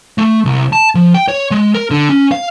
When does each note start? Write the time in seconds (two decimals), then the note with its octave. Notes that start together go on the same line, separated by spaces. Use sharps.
0.18 A3
0.45 C2
0.73 A5
0.95 F3
1.14 G5
1.28 C#5
1.51 G#3
1.74 A#4
1.91 D3
2.09 C#4
2.31 F5